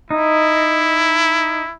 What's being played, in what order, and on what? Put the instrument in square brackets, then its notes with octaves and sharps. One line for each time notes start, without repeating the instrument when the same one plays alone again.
[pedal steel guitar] D#4 [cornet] E4